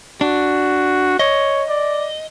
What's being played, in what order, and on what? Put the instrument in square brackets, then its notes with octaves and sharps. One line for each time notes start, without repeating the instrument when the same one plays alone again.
[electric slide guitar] D4 [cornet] F#4
[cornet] C#5 [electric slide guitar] D#5
[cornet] D5